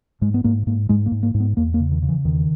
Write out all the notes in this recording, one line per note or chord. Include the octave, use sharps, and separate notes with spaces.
G#2 G#3
B3
G#2 A#3
G#2 A#3
G#2 G#3
A#3
G#2
A#3
G#2
B3
E2 A#3
A#3
C#3
D#3
C#3
E3
E2 D#3